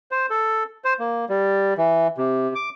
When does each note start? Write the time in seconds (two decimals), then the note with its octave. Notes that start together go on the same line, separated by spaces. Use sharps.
0.11 C5
0.30 A4
0.84 C5
0.99 A#3
1.29 G3
1.78 E3
2.18 C3
2.55 D6